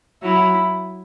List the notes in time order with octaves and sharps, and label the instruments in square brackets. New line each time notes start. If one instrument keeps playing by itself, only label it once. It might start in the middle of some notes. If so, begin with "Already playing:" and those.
[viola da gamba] F#3 [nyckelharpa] E4